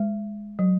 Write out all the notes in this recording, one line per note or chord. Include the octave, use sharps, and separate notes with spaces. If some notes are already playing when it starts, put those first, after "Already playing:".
Already playing: G#3
F#3